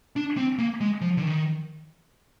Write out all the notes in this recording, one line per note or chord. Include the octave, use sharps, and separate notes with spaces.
D4
C4
A#3
G#3
F3
D3
D#3